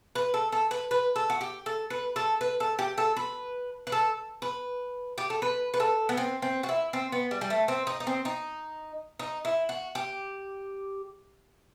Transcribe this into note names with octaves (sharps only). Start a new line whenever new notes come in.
B4
A4
A4
B4
B4
A4
F#4
G4
A4
B4
A4
B4
A4
G4
A4
B4
B4
A4
B4
G4
A4
B4
B4
A4
B3
C4
C4
F#4
E4
C4
B3
G3
G3
A3
C4
D#4
D#4
C4
D#4
D#4
E4
F#4
G4